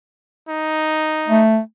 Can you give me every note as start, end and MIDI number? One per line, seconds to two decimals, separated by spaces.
0.49 1.44 63
1.28 1.59 57